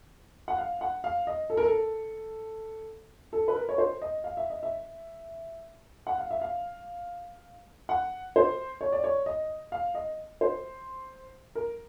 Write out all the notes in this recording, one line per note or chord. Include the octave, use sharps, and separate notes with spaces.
F#5
F5
F#5
F5
D#5
A4
A#4
A4
A4
B4
A#4
C#5
C5
D#5
F5
E5
D#5
E5
F#5
F5
E5
F5
F#5
C5
C#5
D5
C#5
D#5
F5
D#5
C5
A#4